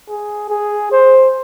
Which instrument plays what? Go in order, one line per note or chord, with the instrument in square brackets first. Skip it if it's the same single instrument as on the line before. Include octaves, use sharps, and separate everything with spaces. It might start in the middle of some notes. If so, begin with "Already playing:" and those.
[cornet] G#4
G#4
C5